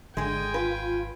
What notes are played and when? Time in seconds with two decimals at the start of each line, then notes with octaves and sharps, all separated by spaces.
0.17 G#1 D3 G#3 G#4 G5 G#5
0.54 F4 B4